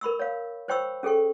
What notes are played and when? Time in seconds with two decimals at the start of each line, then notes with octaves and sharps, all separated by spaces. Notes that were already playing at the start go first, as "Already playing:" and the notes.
0.01 A#4 B5 C#6 E6
0.19 C#5 F5
0.68 C5 C#5 G5 B5 C#6 E6
1.03 C#4 G#4 A4 G5 C#6